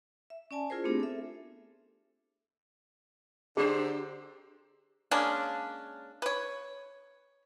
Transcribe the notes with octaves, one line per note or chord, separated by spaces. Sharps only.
E5
C#4 D5 G#5 A5
E4 F4 G#4 A#4 C5
A3 B3 C4 D4 G4 G#4
A4 E5
D3 D4 G4 G#4 C5
G#3 A#3 C#4 D4
B4 C#5